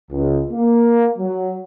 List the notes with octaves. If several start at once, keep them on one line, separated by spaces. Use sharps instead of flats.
C#2
A#3
F#3